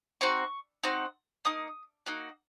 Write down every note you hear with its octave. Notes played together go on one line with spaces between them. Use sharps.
C4 D#4 F#4 C#6
C4 D#4 F#4
A#3 D#4 D#6
A#3 D#4 F#4